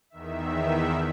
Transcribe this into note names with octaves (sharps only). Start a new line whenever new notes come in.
E2 D#3 E5